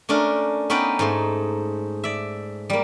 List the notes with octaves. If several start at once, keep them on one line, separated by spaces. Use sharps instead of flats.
A3 C#4 D4 A#4
B3 C#4 D#4 B4 D5 G5
G#2 A3 C6
D5 E5
G3 A#3